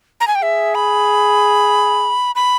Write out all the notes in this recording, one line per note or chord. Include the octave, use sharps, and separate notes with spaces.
A#5
G#5
G5
G#4 E5
B5
B5